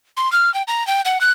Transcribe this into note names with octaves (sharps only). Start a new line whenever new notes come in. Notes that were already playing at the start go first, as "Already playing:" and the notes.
C6
F6
G5
A#5
G5
F#5
F#6